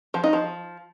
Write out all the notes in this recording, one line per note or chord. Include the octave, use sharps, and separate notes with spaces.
F3
D#4
F3